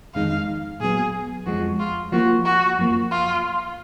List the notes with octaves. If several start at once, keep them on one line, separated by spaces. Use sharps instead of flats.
F2 D#3 G#3 D#4 F5
A#2 F#3 B3 G#4
F2 F3 G#3 F#4
F4
F3 A#3 F4 F#4
F#4
F#2 F3 A#3
F4